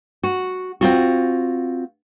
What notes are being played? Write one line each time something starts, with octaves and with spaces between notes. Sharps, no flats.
F#4
C4 F4 F#4